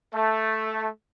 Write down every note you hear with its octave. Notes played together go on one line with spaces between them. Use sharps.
A3